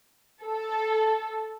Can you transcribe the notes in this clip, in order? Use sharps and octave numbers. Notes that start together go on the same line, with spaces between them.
A4